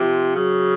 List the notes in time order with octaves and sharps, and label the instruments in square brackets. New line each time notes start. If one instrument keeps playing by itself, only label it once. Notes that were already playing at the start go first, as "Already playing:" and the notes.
Already playing: [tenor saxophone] C3 [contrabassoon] F3
[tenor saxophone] C#3 [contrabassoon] F#3